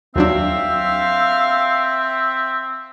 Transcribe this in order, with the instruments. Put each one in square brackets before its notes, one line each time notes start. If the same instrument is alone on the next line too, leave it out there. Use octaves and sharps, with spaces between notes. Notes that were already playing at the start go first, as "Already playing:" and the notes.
[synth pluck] D#2 F#3 D4 [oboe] C4 [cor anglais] E5 [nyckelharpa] F5